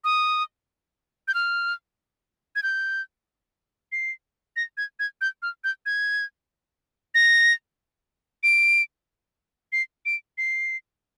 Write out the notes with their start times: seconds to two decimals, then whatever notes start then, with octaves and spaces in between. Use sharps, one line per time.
0.04 D#6
1.28 G6
1.34 F6
2.56 G#6
2.63 G6
3.92 C7
4.56 A#6
4.77 G#6
4.99 G#6
5.21 G6
5.42 F6
5.64 G6
5.86 G#6
7.15 A#6
8.43 D7
9.72 C7
10.06 D7
10.38 C7